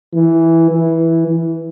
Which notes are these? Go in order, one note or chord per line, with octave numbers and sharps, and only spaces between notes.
E3
E3
E3